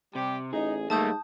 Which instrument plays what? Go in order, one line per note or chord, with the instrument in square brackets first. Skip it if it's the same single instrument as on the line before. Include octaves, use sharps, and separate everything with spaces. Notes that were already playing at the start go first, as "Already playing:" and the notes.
[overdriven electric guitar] C3 [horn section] G3 G4
[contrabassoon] A1 [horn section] D#4 [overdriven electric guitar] G#4
[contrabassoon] G#2 [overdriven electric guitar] G3 A#3 [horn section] A3 [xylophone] A5 D#6 G6